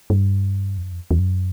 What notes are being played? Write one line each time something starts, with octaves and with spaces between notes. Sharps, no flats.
G2
F2
F#2
F2
E2
F#2